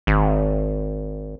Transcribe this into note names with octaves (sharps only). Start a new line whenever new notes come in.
G#1